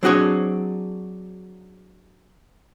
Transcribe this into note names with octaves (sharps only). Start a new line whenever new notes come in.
F#3 C4 D4 F#4 G#4 C#5